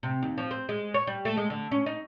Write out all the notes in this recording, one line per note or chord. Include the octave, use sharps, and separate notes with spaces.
C3
D#2
F3
C4
G#3
C#5
G3
A3
G#3
D3
C#4
D#4